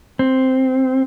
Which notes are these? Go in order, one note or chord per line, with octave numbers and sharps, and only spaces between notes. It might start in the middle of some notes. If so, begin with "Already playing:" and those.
C4